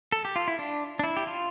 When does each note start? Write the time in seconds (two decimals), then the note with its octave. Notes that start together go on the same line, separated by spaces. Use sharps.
0.12 A4
0.25 G4
0.36 F4
0.48 E4
0.59 D4
0.99 D4
1.03 E4
1.17 G4
1.27 F4